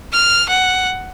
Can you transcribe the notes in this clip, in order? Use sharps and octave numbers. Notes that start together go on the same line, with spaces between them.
F6
F#5